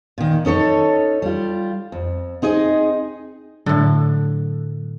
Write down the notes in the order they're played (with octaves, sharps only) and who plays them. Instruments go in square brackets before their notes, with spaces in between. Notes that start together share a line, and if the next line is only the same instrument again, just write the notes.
[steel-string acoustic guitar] A#2 D#3
C#4 D#4 A4 C#5
G3 F4
F2
C4 D#4 G#4 D#5
[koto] A2 D3 [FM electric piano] F#3